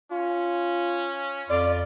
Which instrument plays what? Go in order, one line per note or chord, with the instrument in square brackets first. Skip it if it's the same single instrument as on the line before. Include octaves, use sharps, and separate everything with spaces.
[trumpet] C#4 [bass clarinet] F4
[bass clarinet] F2 [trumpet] F4 [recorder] D5